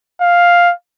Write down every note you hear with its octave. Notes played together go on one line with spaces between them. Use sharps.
F5